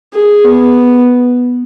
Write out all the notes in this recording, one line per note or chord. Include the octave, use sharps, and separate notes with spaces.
G#4
B3